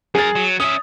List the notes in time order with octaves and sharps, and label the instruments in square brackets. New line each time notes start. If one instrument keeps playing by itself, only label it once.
[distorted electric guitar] F#2 A#4 [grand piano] G#4 A6
[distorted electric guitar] F#3
[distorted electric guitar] C#4 E5 [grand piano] D#6